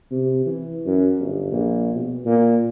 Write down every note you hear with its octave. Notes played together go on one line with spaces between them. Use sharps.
C3
E3
F#2
G1
A#1
B2
A#2